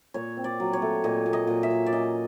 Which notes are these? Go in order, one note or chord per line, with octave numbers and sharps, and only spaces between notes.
A#2 C#5
C4
D5
F#3
C#5
A3
A#2 D#5
A#2
D#5
A#2
E5
A#2
D5
C#4 D#5